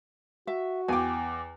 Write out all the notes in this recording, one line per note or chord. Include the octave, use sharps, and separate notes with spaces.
F#4 E5
E2 G5 G#5 D6